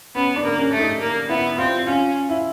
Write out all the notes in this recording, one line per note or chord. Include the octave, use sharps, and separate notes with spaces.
B3 C#4
D4
A#3
C#4
A3
D#4
A#3
B3 E4
C4 F4
C#4 F4
E4